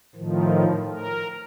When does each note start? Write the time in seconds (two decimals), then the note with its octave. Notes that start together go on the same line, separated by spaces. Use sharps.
0.15 A2 D#3 F3
0.91 A#4